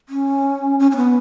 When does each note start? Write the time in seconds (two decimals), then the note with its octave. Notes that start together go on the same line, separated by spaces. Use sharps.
0.09 C#4
0.79 C#4
0.91 C#4
0.96 B3